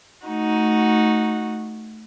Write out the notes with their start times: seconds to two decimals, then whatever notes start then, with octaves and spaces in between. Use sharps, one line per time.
0.25 A3 D#4 F#4